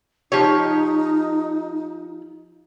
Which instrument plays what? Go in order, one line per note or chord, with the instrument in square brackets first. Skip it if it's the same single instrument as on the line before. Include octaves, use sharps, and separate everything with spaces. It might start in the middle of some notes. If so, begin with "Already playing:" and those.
[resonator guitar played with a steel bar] F3 G4 C#5 [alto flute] D#4